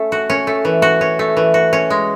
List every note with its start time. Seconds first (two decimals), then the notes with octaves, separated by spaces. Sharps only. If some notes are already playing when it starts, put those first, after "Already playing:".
Already playing: A3 C#4
0.12 F#4
0.30 C#4
0.47 A3
0.65 E3
0.82 F#4
1.01 C#4
1.19 A3
1.37 E3
1.54 F#4
1.73 C#4
1.90 G#3